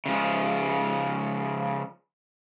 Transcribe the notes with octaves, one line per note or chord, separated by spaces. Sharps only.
C#3 F3 G#3